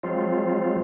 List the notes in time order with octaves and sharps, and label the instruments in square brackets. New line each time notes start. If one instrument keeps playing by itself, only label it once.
[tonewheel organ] F3 F#3 G#3 C4 F4